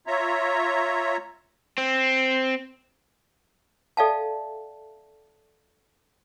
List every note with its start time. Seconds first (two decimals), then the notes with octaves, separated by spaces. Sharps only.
0.07 F4 C#5 E5 A#5
1.78 C4
3.97 A4 D5 E5 F5 G5 A5